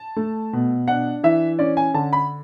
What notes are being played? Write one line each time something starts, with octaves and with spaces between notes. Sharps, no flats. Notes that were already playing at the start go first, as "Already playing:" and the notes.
Already playing: A5
A3
B2
D4 F#5
E3 E5
C#4 D5
G#5
D3 A5
B5